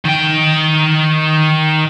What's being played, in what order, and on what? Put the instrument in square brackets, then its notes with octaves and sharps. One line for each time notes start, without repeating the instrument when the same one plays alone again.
[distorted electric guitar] D#3 G5